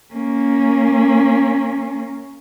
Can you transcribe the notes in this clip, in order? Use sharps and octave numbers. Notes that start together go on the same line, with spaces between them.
A#3 C#4